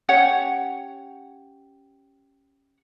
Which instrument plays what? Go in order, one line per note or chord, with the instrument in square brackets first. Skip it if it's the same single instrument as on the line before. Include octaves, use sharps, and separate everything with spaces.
[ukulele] C#4 G4 C#5 F#5